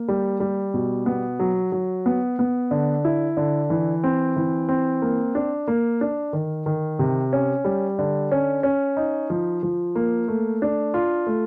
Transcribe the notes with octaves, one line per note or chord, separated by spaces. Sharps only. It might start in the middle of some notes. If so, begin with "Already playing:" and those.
Already playing: A#3
G3
G3
B2
B3
F#3
F#3
B3
B3
D3
E4
D3
E3
C4
E3
C4
A#3
D4
A#3
D4
D#3
D#3
C3
C#4
G3
D3
C#4
C#4
D#4
F3
F3
A#3
A3
D4
F4
A3